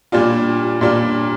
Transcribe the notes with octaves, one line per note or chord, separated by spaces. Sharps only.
A#2 G3 D4 F4
A#2 G3 D4 F4